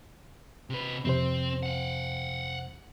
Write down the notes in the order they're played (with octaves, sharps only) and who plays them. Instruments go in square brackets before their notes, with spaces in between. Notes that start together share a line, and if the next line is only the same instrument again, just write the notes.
[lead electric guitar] C3 B4
[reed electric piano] F2 C3 C5 [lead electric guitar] C4
[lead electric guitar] F5 F#5